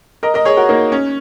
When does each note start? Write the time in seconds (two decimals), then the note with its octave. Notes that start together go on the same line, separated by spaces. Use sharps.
0.23 A#4 D#5
0.34 A#4 D#5
0.45 G#4 C#5
0.57 F#4 A#4
0.69 A#3 D#4
0.92 C#4